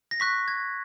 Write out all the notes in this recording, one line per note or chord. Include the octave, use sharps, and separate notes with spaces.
A#6
C#6 F#6 B6
G#6